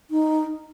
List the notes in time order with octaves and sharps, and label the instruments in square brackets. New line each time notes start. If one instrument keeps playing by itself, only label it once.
[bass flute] D#4